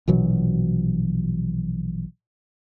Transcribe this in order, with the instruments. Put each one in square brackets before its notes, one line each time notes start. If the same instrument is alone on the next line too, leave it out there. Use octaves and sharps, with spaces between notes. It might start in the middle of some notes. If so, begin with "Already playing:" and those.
[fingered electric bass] A#1 B2 E3 F#3